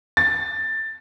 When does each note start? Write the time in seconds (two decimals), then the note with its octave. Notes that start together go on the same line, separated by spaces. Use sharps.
0.17 A6